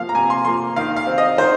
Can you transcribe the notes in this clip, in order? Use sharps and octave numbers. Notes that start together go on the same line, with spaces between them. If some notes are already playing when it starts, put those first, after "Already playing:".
Already playing: C3 F3 A#3 F5
A#5
C3 G#5
C6
F3 A#3 C6
D#3 F5
F5
C4
D#5
D#3 C5